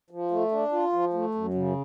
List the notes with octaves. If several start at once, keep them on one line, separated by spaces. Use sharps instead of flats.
F3
A3
D4
F4
F3
A3
F#2
C#3